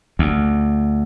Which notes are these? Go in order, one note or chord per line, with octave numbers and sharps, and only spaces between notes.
D2